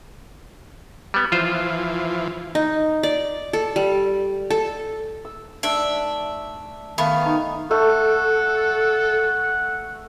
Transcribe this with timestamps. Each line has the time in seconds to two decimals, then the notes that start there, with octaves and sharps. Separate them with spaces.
1.14 G3 B3
1.32 E3 F3 F4 C5
2.55 D#4
3.03 D5
3.53 A4
3.76 G3
4.50 A4
5.25 E6
5.63 A3 D4 D5 E5
6.98 D#3 A3 B3 F5
7.25 D#4
7.71 A3 A4 F#5